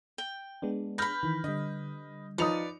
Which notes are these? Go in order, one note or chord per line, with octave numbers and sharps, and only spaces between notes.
G5
G#3 B3 D4
B4 B5 F6 G6 A#6
D#3 E3
D3 G3 D#5
F3 D#4 B4 D5 D#6 C#7 F7